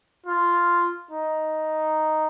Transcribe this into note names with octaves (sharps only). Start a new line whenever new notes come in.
F4
D#4